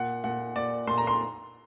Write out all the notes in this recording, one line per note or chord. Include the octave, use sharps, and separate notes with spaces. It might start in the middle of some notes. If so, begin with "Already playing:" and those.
Already playing: A#2 F#5
A#2 F#5
A#2 D5
A#2 C6
A#5
C6